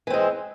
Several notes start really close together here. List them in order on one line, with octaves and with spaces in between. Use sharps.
E3 C4 G#3